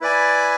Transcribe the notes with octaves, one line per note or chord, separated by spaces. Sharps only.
E4 B4 D5 G#5